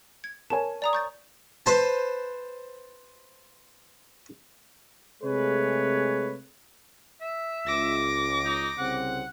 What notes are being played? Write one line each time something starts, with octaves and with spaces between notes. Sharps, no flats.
G#6
A#4 C#5 G#5 A5
D5 A#5 D#6
C#6 G6 A6
B4 C5 A5
C3 G#3 A3 G#4 B4 C#5
E5
C#2 D6 A#6
D#4
C2 C#3 C4 F#5